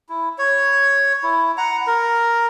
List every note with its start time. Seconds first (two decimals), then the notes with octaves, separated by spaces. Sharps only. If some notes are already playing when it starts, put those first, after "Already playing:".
0.09 E4
0.38 C#5
1.23 E4
1.58 F#5 A#5
1.87 A#4